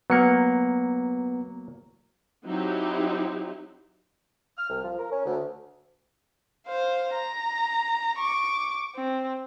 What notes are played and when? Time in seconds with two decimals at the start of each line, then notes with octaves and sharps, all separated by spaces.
0.10 F#3 A#3 B3 C#7
2.45 F#3 C4 D#4 E4 G4
4.57 F6
4.69 C2
4.83 F3
4.99 A#4
5.11 C#4
5.25 D2
6.67 C5 F5
7.14 A#5
8.19 C#6 D6
8.96 C4